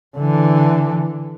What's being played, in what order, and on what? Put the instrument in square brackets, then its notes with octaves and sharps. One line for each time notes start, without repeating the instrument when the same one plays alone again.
[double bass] D3 E3